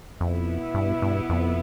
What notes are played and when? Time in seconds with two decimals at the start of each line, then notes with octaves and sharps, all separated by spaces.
0.20 F2 B2 B3 E4
0.74 G2
1.02 G2
1.29 F2